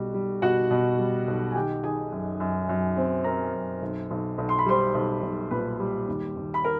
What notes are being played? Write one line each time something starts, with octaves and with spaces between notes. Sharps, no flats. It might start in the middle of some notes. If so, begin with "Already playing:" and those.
Already playing: B1 B2 G3 F#4
G3
B2 F#4 F#5
B2
G3
B1
G#5
D#3 G4 G5
D#3 G#4 G#5
F#2
F#2
F#2
C4
C4 A#4 A#5
F#2
B1
B1
B1
C6
B5
G3 C5 C6
B1
B1
A#2 B4 B5
G3
D#2
D#2
B5
A#4